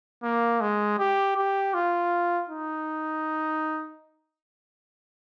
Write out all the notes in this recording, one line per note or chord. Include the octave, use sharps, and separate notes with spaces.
A#3
G#3
G4
G4
F4
D#4